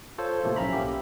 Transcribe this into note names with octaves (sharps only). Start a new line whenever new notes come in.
F4 A4 C5 C#5
A2 C3 F3 A3 A#3
B1 C#4 E5 A#5 B5
A#3 G4